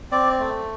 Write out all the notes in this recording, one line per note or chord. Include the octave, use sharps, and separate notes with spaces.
C4 D5
A3